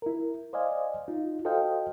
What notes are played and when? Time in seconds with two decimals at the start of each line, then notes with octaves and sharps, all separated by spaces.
0.02 E4 A#4
0.53 C5 D5 D#5 F5 G#5
1.08 D#4 F4
1.45 F#4 A4 C5 D#5 F5 G5